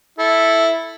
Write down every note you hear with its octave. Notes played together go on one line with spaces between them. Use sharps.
E4 A4